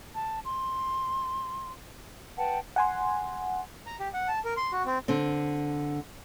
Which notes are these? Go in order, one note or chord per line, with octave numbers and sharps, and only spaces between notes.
A5
C6
B4 F#5 G5 A5
F#5 G#5 C6
A#5
G4
F#5
A5
A#4
C6
F#4
C4
D3 C4